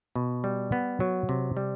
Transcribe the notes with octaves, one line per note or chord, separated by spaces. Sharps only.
B2
G3
B3
F#3
C3
G3